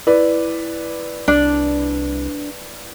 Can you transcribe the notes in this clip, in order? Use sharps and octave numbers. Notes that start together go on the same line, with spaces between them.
E4 B4 D5
C2 D4